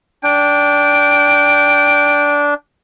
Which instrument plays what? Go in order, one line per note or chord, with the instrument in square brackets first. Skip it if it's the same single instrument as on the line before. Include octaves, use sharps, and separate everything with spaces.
[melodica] D4 [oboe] G5